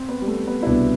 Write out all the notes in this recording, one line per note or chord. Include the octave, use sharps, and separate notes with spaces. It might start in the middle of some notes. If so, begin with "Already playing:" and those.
Already playing: C4
B3
G3
A3
B3
E4
C2 B2 B3 D4